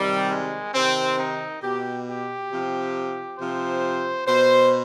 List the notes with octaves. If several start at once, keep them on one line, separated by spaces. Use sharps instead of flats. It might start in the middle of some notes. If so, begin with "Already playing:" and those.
Already playing: C3 D#3 G3
G#3
C3 D#3 C4
D#4
B2 G4
G4
C3 F3
C3 F3 C5
B2 C5